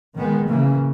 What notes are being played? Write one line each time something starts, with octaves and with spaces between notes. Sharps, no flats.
D#3 G#3 B3
C#3 E3 A#3